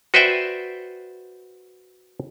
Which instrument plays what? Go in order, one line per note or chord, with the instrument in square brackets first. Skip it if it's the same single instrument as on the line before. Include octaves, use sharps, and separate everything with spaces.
[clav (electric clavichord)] F#4 B4 C5 D5 E5 G5